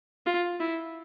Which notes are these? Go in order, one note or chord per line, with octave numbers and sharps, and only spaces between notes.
F4
E4